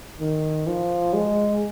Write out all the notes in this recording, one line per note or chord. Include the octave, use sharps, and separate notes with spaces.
D#3
F3
G#3